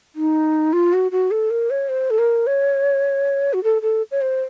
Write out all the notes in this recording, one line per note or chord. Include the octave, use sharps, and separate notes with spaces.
D#4
F4
F#4
F#4
A4
A#4
C#5
C5
A4
A#4
C#5
F#4
A4
A4
C#5
C5